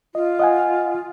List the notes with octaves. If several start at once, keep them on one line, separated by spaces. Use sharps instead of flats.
F4 D#5
D#5 F#5 G#5